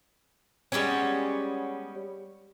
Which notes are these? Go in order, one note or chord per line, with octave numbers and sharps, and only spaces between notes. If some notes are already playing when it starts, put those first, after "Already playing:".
G3 G#3 B3 C#4